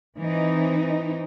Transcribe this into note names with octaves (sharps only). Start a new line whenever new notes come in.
E3 C4 D#4